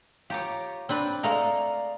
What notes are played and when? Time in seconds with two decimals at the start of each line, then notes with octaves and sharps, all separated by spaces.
0.30 F4 G4 C#5 A#5 D6
0.89 C4 D4 B4
1.23 G#3 A3 D5 D#5 F5 A#5